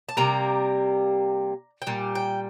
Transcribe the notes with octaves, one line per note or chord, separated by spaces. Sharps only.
A5
C3 G3 A#3 A#5
G5
A#2 G3
G5